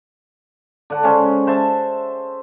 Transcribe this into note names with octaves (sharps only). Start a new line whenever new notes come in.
D3 F#5
C#3 G#3 C#4 C5
C5 E5 A5